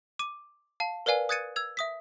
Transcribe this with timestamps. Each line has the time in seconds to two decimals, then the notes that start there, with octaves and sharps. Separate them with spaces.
0.19 D6 D#7
0.80 F5 A5
1.06 A#4 B4 D5 F5 G#5
1.29 D#6 F#6 G#6 A6 C#7 D#7
1.56 E6 G#6 F7
1.77 E5 D#6 B6